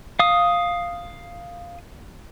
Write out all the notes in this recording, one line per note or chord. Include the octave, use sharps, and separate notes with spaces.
F5 D#6